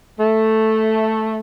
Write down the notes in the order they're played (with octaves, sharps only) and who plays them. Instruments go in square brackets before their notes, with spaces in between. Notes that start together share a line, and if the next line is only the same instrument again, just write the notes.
[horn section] A3